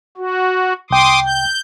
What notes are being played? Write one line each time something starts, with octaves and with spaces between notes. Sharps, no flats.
F#4
C2 G5 C6 D6 D#6
G6